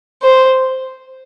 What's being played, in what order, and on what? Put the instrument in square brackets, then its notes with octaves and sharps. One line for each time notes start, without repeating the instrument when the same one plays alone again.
[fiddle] C5